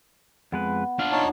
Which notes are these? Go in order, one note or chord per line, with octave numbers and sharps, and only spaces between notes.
F2 G#3 B3 B4
D4 F4 F5
D#4 C#5 A5